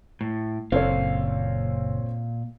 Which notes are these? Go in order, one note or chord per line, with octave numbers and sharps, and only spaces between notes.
A2
F#1 A#2 C4 A4 C#5 F5